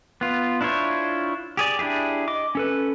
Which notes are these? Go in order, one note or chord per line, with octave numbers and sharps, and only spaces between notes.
B3 F4
D4 E4 F4 C5 C#5
G4 G#4 D5
D4 E4 G4 G#4
D#5 D6
C#4 A4 B4